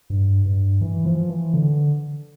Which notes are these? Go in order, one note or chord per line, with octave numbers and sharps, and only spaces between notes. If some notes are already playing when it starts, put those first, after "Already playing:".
G2
G2
E3
F3
E3
D3